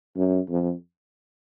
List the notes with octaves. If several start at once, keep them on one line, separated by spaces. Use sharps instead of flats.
F#2
F2